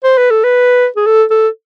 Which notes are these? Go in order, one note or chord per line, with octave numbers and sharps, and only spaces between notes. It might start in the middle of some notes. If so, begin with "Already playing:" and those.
C5
B4
A4
B4
G#4
A4
A4